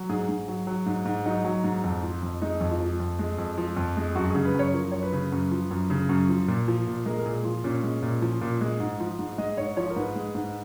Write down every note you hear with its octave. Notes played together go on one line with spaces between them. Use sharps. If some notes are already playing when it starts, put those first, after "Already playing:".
Already playing: F#3
G#2 G#4
G#2
F#3
F#3
G#2
G#2
F#3 D#4
F#3
G#2
F2
F3
F2
G#3 D#4
F2
F4
F3
F2
G#3
F2
F3
F2
G#3
F#2 F#4
C#3 G#4
B4
F#2 C#5
F3 A#4
F#2 C#5
B4
C#3
F#2
F3
F#2
C#3
F#2
F3
A#2
F3
A#2
G#3 A#4
A#4
A#2 G#4
F3 F4
A#2 C#4
G#3
A#2
F3
A#2
G#3
G#2
F3
G#2
G#3 D#5
G#2 C#5
F3 C#5
A#4
G#2 B4
G#3
G#2